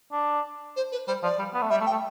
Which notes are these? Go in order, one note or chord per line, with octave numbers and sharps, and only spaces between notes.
D4
C5
B4
G3 C5
F3 D5
G3
B3
A3
G3 E5
A3
G5
A3